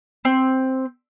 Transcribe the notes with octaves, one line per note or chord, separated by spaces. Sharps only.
C4